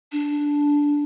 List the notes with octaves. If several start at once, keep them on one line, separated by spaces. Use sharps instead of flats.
D4